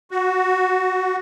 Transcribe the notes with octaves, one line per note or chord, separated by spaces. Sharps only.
F#4